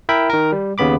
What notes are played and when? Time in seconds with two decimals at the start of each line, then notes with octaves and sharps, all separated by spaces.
0.09 E4 A#4 E5 G5 B5
0.30 D#3 A#4
0.52 G3
0.78 D#2 C#3 B3 B5 D6